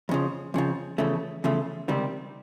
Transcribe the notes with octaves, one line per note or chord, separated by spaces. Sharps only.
F2 C#3 F3
F2 C#3 F3
E2 C#3 F3 A3
E2 C#3 F3 A3
C#2 C3 D#3 G3 C4